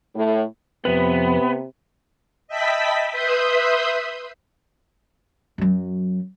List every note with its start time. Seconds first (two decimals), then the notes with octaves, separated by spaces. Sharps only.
0.15 A2
0.85 F2 C3 B3 B4
2.48 D#5 E5 G5 A5 B5 B6
3.12 B4 E5 B5 C6 D#6 G6
5.58 F#2 F#3